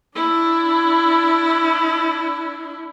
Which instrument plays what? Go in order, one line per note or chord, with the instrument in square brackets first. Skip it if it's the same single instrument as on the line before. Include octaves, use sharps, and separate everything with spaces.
[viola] D4 E4